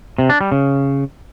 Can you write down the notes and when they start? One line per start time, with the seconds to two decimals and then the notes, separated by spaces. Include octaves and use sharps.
0.18 C3
0.30 D4
0.41 G3
0.52 C#3